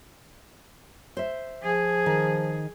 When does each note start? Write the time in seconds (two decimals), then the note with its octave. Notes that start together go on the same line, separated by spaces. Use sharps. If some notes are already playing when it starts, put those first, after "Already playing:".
1.17 C5 E5
1.63 F3 G#4
2.06 D#3